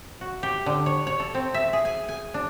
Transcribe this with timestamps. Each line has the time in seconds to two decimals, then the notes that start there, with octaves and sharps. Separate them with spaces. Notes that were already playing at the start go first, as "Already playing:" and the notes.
0.21 F#4
0.43 G4
0.66 D3
0.86 C#5
1.07 C#5
1.20 A4
1.35 C4
1.54 E5
1.73 G#4
1.85 G#5
2.09 G#5
2.34 D4